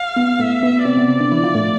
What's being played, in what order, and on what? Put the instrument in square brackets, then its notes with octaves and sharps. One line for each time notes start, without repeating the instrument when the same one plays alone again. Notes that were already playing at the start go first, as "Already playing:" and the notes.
Already playing: [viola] F5
[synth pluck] B2 B3
[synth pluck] A2 A3 [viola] E5
[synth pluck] B2 B3
[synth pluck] C3 C4 [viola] D5
[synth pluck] B2 B3
C3 C4
D3 D4
E3 E4
F3 F4
A2 A3